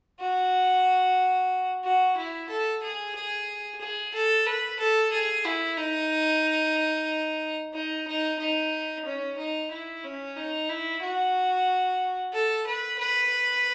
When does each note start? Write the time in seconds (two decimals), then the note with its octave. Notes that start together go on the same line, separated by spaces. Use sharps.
0.20 F#4
1.84 F#4
2.17 E4
2.49 A4
2.82 G#4
3.15 G#4
3.81 G#4
4.13 A4
4.46 B4
4.79 A4
5.12 G#4
5.45 E4
5.77 D#4
7.73 D#4
8.07 D#4
8.39 D#4
9.05 C#4
9.37 D#4
9.71 E4
10.04 C#4
10.36 D#4
10.69 E4
11.02 F#4
12.33 A4
12.66 B4
12.98 B4